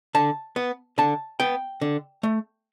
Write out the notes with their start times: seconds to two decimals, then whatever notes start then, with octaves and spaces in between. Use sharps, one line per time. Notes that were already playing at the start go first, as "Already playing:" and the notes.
0.15 D3 A5
0.56 B3
0.98 D3 A5
1.40 B3 G5
1.81 D3
2.23 A3